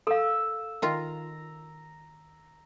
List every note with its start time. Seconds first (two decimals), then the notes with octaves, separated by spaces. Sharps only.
0.07 A4 F5 E6
0.82 D#3 F4 A#5